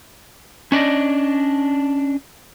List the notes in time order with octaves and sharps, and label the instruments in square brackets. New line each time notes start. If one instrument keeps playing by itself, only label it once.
[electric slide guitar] C#4 D4 D5 D#5